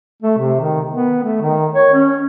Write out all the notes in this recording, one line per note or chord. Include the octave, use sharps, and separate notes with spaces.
A3
C3
D#3
B3
A3
D#3
C#5
C#4